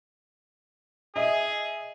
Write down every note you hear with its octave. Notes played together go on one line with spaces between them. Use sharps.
G#4 D#5 E5